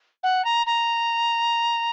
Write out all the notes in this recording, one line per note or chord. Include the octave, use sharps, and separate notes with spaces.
F#5
A#5
A#5